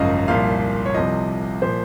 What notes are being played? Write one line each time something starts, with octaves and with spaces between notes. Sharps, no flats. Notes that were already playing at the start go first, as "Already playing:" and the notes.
Already playing: G#1 F#2 C#3 F3 D#5 F5
C2 A#2 F3 F5
C#5
C2 C3 F3 D#5
A#2 F3 C5